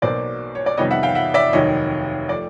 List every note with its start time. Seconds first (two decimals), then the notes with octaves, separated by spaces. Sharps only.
0.02 B1 B2 F#3 A#3 C5 D5
0.55 C#5
0.66 D5
0.77 F2 C3 D#3 G3 B3 C#5 D#5
0.91 E5 F#5
1.03 F5 G5
1.15 E5 F#5
1.34 D5 E5
1.53 F1 D#2 D#3 F#3 C#5 D#5
2.29 F3 A3 D5